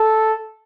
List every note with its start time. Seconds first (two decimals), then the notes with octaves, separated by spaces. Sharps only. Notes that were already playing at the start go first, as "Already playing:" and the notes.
Already playing: A4